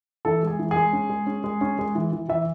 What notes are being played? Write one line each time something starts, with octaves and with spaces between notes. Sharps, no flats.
E3 A4
G#3 G#4
E3
G#4
G#3
C#4
G#3
C#4
G#3
C#4
G#3
E3
E3
E3 E5